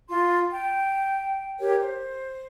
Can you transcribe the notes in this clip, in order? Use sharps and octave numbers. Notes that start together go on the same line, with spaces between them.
F4 C6
G5
G4 A#4 C#5 G5
C5